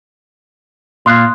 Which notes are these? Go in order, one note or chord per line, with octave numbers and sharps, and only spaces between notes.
A#2 F5 C6 D#6 F#6